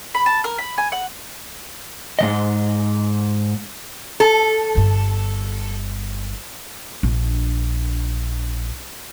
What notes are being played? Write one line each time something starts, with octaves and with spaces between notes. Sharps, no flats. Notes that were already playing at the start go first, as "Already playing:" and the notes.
B5
A5
A#4
B5
G#5
F#5
G#2 D#3 D#5
A4
G1 G2
A#1 D4